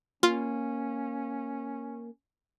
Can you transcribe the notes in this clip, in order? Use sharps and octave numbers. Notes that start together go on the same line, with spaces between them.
A#3 C#4 F4